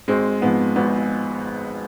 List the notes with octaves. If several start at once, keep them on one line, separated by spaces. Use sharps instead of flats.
G#1 G#3 C4
G#2 F3 B3
G#1 B3